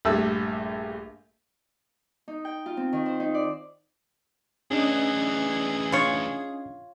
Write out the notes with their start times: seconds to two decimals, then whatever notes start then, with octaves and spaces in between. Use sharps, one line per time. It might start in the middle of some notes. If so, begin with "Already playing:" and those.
0.05 A#1 G2 A3 E6
2.28 D#4
2.45 G5
2.66 F4
2.77 C4
2.93 D#3
3.06 C5
3.20 D#4
3.34 D5
4.71 D2 E3 C#4 D4 G#4 D#5
5.92 F4 C#5